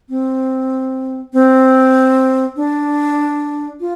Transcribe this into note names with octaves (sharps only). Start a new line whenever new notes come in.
C4
C4
D4
F4